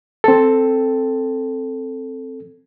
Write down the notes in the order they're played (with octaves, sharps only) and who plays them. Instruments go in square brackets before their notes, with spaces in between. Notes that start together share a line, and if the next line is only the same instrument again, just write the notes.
[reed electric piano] C4 A4